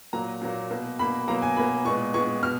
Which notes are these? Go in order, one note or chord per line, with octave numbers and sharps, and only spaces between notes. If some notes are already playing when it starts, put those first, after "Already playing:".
A#2 F#3 A#3 A#5
A#2 F#3 A#3
B2 A#3
B2 A#3 B5
B2 F#3 A#3 A#5
G#5
B2 F#3 A#3 B5
A#2 G#3 B3 C#6
A#2 G#3 B3 C#6
B2 F6